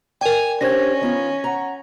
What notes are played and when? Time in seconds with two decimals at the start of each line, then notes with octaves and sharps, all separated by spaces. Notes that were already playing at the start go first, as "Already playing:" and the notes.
0.21 A#4 D5 G5 G#5
0.61 C#4 D4 G4 C5 G#6 A#6
1.01 D#3 B3 F4
1.44 F#5 A#5